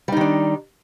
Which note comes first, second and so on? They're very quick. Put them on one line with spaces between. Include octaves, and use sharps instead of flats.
G3 D#4 D#3 D4